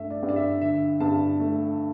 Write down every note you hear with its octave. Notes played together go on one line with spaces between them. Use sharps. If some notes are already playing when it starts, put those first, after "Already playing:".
Already playing: G2 A3 E5
D5
G2
D5
E5
D3 E5
G2 A5
A3